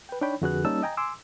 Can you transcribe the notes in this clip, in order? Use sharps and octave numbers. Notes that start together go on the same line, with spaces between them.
B4 G5
D4 D#4 C#5 G5 B5
F2 D3 F#4 G#4 B4 F#6
G3 A#3 C#4 D#4 A5 E6
D#5 G5 G#5 A#5
G#5 C6 D6 E6